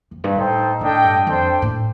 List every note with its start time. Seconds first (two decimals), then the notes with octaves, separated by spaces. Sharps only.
0.11 F2
0.24 G2
0.35 A2 D#4 A4 C5 D#5 G5
0.81 A2 D4 A4 D#5 G5
1.04 G2
1.27 F2 D4 A4 C5 G5
1.62 A2